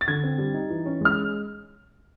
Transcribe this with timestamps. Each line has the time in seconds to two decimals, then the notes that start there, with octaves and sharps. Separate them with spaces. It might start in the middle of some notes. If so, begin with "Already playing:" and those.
0.01 A6
0.08 D3 G#6
0.23 C4
0.38 G3
0.54 D#4
0.70 E3
0.86 C#4
1.01 G#3 F6